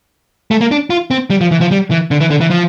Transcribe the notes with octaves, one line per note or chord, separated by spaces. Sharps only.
A3
A#3
D4
F4
C4
G3
F3
E3
F3
G3
E3
D3
E3
D3
E3
F3